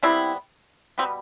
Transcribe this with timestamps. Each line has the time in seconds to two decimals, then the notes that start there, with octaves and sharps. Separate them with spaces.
0.03 C3 G3 B3 C4 E4
0.98 B2 G3 B3 C4